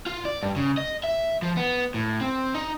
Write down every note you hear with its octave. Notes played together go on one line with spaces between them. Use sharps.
F4
D5
G2
C#3
D#5
E5
F3
B3
A2
C4
D#4